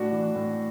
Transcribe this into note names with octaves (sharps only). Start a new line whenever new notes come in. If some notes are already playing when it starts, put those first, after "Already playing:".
Already playing: A2 D4 F#4
E3
A2